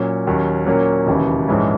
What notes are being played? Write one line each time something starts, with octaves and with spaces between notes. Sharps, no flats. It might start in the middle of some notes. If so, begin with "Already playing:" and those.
Already playing: A#2 F#3 C#4
D#2 D#3 F#3 C#4
A#2 F#3 A#3 C#4
E1 D#2 C#3 E3
A#1 G#2 E3 G#3 C#4